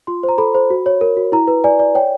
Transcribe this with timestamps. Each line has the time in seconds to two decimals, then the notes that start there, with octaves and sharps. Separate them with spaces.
0.07 F4 C6
0.23 C5
0.29 A#5
0.38 A4 B5
0.54 C5
0.70 F#4
0.86 C#5
1.01 A#4
1.17 F#4
1.32 E4 A#5
1.48 B4
1.64 D5 G#5
1.79 D5
1.95 C#5 G5